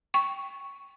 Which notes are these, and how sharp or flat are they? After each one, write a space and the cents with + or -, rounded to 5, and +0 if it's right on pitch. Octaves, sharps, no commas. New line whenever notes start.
G5 +0 C#6 +0